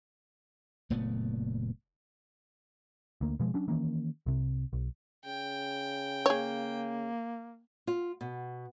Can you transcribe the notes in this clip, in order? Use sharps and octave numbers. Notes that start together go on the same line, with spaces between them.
F#1 A#2 A3 B3
D2 A#3
B2 F3 G#3
F#3 C#4 D4
D#3 E3 A#3 C#4
C2 C3
B1
C#3 G5
A#3 G#4 C#5
F4
B2